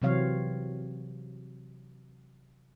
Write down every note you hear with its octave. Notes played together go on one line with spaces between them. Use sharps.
C3 E3 F#3 C4 C#5 F5